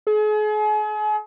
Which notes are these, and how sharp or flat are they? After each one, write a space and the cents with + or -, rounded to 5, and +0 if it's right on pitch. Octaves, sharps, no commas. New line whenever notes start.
G#4 +40